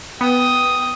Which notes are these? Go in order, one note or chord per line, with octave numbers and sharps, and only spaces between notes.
B3 G5 D#6